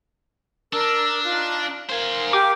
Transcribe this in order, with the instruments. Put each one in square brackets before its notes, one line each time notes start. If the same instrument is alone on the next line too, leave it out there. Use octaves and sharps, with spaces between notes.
[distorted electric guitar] D4 [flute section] A#4 E6
[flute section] D#4 F4 F#6
[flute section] A#4 F5 [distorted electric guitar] C5 G#5
[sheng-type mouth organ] G4 [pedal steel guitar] D6